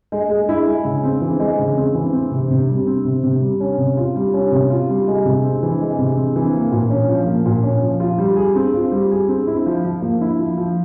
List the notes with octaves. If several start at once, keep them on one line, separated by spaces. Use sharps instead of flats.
G#3
G#3
E4
G#3
C#3
C4
E3
G#3
C#3
C4
E3
C4
C3
C3
G3
C4
C3
C3
G3
C#4
C3
F4
G3
C#4
C3
F4
G3
G#3
C3
C4
E3
G#3
C3
C4
E3
A#3
A#2
C#4
F3
A#3
A#2
C#4
F3
F4
G3
G#4
C4
F4
G3
G#4
C4
E4
F3
F3
A#3
E4
F3
F3